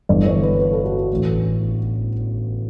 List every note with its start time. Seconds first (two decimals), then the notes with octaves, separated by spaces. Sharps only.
0.09 G1 G2 E3 D5
0.26 C#5
0.43 B4
0.59 B4
0.73 A4
0.85 F#4
0.98 F#4
1.11 A1 A2 E3